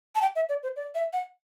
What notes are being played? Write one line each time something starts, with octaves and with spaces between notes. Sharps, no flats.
A5
G5
E5
D5
C5
D5
E5
F#5